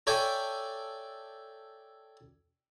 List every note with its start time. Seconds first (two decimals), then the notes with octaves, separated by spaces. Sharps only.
0.07 A4 C#5 D5 E5 G5 G#5